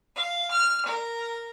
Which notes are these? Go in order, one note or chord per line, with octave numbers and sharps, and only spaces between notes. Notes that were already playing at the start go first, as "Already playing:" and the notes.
F5
F6
A#4